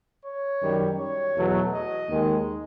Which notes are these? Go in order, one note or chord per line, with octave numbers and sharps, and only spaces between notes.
C#5
F#2 D#3 G3
C#5
E2 B2 F#3 A3
D#5
D#2 D#3 G#3